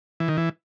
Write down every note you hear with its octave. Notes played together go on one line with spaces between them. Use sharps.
E3
D#3
E3